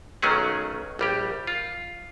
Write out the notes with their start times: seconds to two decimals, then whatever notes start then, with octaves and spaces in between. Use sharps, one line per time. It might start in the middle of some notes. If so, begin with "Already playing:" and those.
0.22 B1 D#3 F#3 A3 C#4 G#4
0.99 A#1 G3 G4
1.47 F4